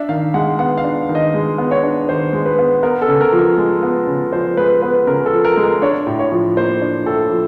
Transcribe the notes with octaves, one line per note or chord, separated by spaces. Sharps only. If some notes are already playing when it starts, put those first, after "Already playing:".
Already playing: D4 E5
D#3 F5
G#3 F#5
B3 F#5
F5
D4
D#3
D#5
G#3
B3
C#5
D4
D#3 C5
G#3
B4
B3
B3 A#4
A4
C#3
A#4
F3
A#4
G#3
B3
C#3
F3 C5
G#3 B4
B3 B4
C#3 A#4
A4
F3
A#4
G#3
A#4
D4 C#5
A2
C#5
F3
A#3 C5
D4
A2 A4
F3